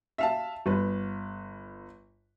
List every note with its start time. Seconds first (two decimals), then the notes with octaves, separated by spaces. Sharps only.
0.18 E5 F5 A5
0.66 G1 B4